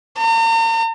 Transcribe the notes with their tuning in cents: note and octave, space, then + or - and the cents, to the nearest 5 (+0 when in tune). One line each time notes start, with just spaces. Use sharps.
A#5 -45